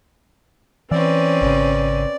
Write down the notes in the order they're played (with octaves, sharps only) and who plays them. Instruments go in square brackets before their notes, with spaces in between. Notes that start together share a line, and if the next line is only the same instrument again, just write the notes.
[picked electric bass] E3 [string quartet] C4 C#4 B4 [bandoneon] D5
[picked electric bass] G#1 C#3